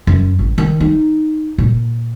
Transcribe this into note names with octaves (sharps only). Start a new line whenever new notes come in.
F#2
A1
D#3
D#4
A#2